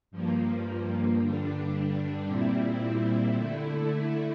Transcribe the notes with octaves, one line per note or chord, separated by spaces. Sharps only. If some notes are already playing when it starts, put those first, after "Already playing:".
G2 F3 A#3
G2 D3 G3 D4
A#2 G3 C4 E4
D3 A3 E4